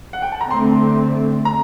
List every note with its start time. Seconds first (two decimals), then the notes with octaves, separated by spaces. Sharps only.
0.13 F#5
0.22 G5
0.32 A5
0.41 A#5
0.50 D3 A3 C4 C6
1.45 A#5